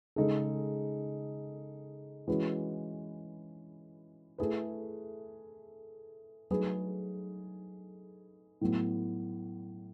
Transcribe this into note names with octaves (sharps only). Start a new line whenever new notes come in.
C#3 G#3 D#4 A4
E3 G#3 C#4 F#4 B4
A3 E4 G#4 B4
F#3 A3 D#4 G#4 B4
A2 F#3 B3